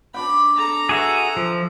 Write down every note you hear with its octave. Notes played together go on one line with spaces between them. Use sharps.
D4 D5 G5 B5
A4 A#5
F#4 G#4 E5 C#6
F3